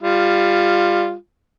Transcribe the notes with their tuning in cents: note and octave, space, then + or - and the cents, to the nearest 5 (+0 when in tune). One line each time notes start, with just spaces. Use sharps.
G3 +20 F4 +0